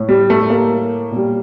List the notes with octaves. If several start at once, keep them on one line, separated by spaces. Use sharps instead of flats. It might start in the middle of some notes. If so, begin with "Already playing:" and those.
Already playing: A2
G3
A3
A#3
A#2
G3